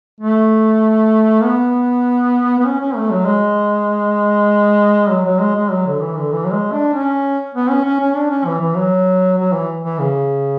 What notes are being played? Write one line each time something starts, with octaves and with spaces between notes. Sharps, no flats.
A3
B3
B3
C#4
C#4
A3
F#3
G#3
F#3
F#3
G#3
G#3
F#3
D3
E3
D3
E3
F#3
G#3
D4
C#4
B3
C#4
C#4
C#4
D4
C#4
E3
E3
F#3
F#3
E3
E3
C#3